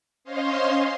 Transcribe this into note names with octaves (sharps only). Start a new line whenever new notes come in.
C#4 C5 C#5 D#5 F5 C6